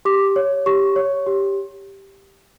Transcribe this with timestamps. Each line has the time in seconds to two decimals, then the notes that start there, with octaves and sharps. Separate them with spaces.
0.05 G4 D6
0.36 C#5
0.66 G4 C#6
0.96 C#5
1.27 G4